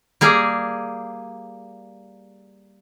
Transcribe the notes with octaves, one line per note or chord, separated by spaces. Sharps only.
G3 A#3 G#4